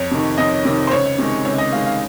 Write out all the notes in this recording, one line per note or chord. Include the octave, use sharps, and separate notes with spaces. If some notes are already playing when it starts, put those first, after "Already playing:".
Already playing: F2 C#5
C3 D#3
F2 D#5
C3 D#3
C5
C#2 C#5
C3 D#3 G#3
C#2 C#5
D#5
C3 D#3 G#3 F5
F5